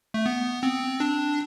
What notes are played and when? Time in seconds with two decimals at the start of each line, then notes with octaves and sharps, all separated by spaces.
0.14 A3
0.26 B3
0.63 C4
1.00 D4